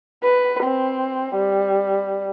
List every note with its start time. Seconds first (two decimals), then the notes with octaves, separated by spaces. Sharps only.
0.23 B4
0.64 C4
1.35 G3